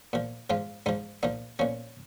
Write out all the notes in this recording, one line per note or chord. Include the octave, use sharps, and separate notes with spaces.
A#2 F3
G#2 F3 F4
G#2 F3 D#4
A#2 F3 D#4
A#2 F3 C#4